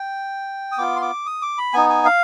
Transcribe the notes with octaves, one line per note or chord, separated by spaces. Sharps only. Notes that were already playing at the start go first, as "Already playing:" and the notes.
Already playing: G5
D#6
B3 F4 D6
C6
D6
D#6
D6
B5
B3 D#4 G#5
G#5
F5